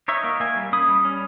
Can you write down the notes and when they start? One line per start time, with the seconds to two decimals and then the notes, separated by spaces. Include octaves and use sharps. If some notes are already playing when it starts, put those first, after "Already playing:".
0.08 D#4 C#5 E5
0.24 A#3
0.40 A#3 E5 G#5
0.57 G3
0.72 C#4 B5 D#6
0.88 G3
1.05 C#4